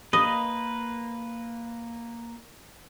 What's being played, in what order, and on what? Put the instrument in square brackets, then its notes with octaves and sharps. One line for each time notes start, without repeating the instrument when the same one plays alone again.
[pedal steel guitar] A#3 B4 [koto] D#5